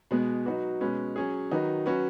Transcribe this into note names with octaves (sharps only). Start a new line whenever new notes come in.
B2 G#3 B3
F#3 D#4 F#4 B4
B2 G#3 C#4 B4
F#3 C#4 G#4
D#3 F#3 D#4 F#4 B4
F#3 C#4 F#4 B4